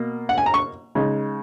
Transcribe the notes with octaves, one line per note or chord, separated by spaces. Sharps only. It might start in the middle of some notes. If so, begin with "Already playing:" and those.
Already playing: B2 A#3
F#5
G#5
A#5
C#6
C#3 G#3 D#4